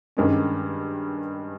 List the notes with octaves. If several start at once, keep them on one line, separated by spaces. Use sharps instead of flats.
G2 D#3 G#3 C#4